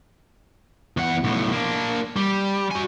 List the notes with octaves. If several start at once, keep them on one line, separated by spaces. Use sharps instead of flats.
E2 F#5
B1 A2
A#3 D4
G3
F#4 G#5